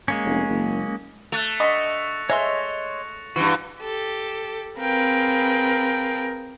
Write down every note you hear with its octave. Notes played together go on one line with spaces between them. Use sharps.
G#3 A#3 C#4
F1
F#1
A3 F#6 A6 F7
D3 D#5 C#6 A#6 C#7
G#3 C#5 D#5 E5 C6
G2 E3 F#4
G4 A4
C4 G#4 A#4 B4 F5 G5